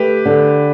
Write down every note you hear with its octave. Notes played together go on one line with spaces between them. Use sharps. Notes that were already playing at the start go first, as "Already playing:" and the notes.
Already playing: A3 G4 B4
D3